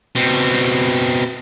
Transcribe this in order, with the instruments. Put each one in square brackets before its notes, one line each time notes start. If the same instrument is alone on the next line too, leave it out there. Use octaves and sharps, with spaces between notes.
[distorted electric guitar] B2 C4